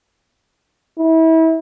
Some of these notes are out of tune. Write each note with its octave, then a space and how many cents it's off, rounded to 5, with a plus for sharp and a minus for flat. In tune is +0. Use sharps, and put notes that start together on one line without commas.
E4 -30